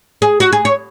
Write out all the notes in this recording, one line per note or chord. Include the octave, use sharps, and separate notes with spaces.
G#4
F#4
G#4
C#5